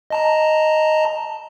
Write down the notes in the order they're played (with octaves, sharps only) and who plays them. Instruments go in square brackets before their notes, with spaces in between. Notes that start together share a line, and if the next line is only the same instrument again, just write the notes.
[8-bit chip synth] D#5 A5 A#5